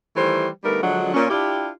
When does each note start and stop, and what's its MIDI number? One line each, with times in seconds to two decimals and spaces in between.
0.16 0.49 51
0.16 0.49 52
0.16 0.49 55
0.16 0.49 57
0.16 0.49 67
0.16 0.49 72
0.64 0.81 50
0.64 0.81 55
0.64 0.81 57
0.64 0.81 59
0.64 0.81 63
0.64 0.81 70
0.82 1.12 50
0.82 1.12 53
0.82 1.12 54
0.82 1.12 56
0.82 1.12 62
0.82 1.12 66
1.14 1.26 46
1.14 1.26 61
1.30 1.69 62
1.30 1.69 64
1.30 1.69 65
1.30 1.69 67